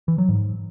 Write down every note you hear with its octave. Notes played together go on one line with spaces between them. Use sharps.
E3
F#3
G#2